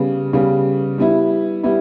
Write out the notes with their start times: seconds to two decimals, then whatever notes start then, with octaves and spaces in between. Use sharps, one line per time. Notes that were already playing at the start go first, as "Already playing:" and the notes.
Already playing: C#3 G3 B3
0.33 C#3 G3 B3
0.98 G3 B3 E4
1.63 G3 B3 E4